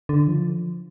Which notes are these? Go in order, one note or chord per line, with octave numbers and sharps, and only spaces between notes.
D3
F3